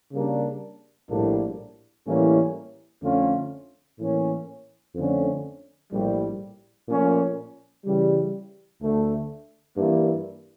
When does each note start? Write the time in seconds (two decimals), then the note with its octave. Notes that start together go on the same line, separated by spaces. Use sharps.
0.12 C#3 G3 A#3 D4
1.09 A#1 A2 G3 A#3 D4
2.06 A2 E3 G3 A#3 C#4
3.02 F2 D3 A3 C#4 F4
3.99 A2 E3 A#3 C#4
4.95 F2 D3 A3 C#4
5.91 A#1 A2 G3
6.88 A#2 F3 A3 C#4
7.85 C#3 E3 G3
8.82 D2 D3 A3
9.77 G2 E3 G3 A#3 E4